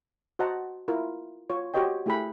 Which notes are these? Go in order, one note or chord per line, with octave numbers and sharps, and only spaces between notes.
F#4 C5 D#5 F#5 A5 A#5
E4 F4 A#4
F4 C#5
F#4 G4 C5 C#5 D#5 G5
A3 E4 G4 G#4 G5 B5